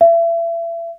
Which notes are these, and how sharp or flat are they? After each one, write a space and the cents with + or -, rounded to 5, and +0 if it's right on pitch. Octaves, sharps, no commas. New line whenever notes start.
E5 +35